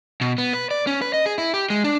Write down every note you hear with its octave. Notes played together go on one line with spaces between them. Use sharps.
B2
B3
B4
D5
C#4
B4
D#5
G#4
E4
G4
G#3
D4